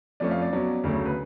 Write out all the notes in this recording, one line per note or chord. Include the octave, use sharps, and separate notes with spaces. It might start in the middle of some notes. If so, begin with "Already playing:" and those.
F2 F3 A3 C#4 D5
F5
D5
B2 F#3 C#4
D2 C#3 F#3 A3 C#4
B4